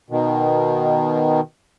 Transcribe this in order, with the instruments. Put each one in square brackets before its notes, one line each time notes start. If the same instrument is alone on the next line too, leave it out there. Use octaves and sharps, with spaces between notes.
[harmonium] B2 D#3